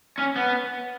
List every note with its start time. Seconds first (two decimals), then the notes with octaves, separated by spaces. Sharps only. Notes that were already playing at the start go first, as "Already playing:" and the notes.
0.19 C#4
0.36 B3